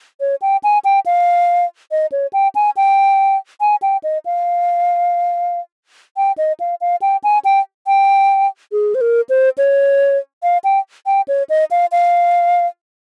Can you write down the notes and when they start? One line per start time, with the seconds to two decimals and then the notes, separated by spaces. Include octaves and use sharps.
0.20 C#5
0.42 G5
0.64 G#5
0.85 G5
1.06 F5
1.91 D#5
2.12 C#5
2.33 G5
2.55 G#5
2.77 G5
3.61 G#5
3.82 G5
4.03 D#5
4.26 F5
6.17 G5
6.38 D#5
6.60 F5
6.81 F5
7.02 G5
7.24 G#5
7.45 G5
7.87 G5
8.72 G#4
8.95 C5
9.01 A#4
9.29 C5
9.58 C#5
10.43 F5
10.64 G5
11.06 G5
11.28 C#5
11.50 D#5
11.71 F5
11.92 F5